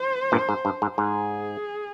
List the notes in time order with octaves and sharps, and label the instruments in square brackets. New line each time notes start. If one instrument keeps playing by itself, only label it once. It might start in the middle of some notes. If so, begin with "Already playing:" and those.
Already playing: [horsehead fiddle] C5
[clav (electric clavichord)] G2 A#2
G#2
G2
G#2
[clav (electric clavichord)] G#2 [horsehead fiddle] G#4